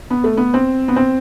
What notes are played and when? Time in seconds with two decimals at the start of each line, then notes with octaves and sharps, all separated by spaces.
0.10 B3
0.24 A3
0.37 B3
0.54 C4
0.88 B3
0.96 C4